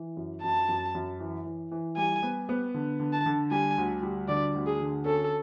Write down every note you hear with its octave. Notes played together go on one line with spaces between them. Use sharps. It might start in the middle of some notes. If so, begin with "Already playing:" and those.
Already playing: E3
F#2
F#2 A5
F#2
F#2
E3
E3
E3
G3 G#5
B3
B3
D3
D3
A5
D3
G3 G#5
D2
G3
D3 D5
D2
G#4
D3
C#4 A4